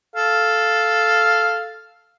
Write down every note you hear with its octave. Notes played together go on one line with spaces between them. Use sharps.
A4 F5